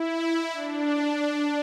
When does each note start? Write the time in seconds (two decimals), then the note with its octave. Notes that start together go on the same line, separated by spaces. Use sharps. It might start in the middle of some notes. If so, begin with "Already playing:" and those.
Already playing: E4
0.52 D4